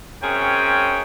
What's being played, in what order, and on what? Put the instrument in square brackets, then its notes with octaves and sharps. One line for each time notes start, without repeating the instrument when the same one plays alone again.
[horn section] F#2 C4 C#4 G#4 C#5 G5